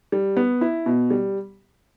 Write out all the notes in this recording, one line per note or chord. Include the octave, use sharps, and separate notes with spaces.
G3
B3
E4
B2
G3